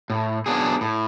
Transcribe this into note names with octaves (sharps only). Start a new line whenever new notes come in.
A2
F#3 B3 D4 G#4
A2